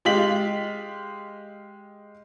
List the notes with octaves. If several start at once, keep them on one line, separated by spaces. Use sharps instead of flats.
G#3 G4 F5 B6 F#7